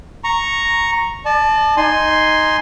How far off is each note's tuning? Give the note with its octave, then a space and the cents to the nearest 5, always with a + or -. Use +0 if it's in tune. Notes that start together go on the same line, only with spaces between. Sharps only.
A#5 +0 C#6 -5
D5 +40 A5 -15
D#4 +0 G#5 +0 C6 +0